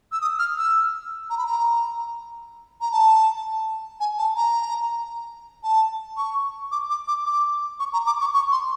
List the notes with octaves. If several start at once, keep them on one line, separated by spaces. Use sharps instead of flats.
E6
D#6
F6
E6
A#5
B5
A#5
A#5
A5
G#5
A5
A#5
A5
C#6
D6
D6
D6
D6
C#6
A#5
D6
C#6
C#6
C6